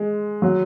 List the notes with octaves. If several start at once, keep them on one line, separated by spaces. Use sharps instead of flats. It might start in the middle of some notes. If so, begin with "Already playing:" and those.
Already playing: G#3
F#3